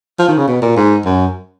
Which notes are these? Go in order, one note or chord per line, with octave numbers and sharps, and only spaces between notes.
F3
D#3
C#3
B2
A#2
G#2
F#2